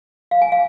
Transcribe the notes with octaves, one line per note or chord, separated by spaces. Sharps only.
F5
G#5
F5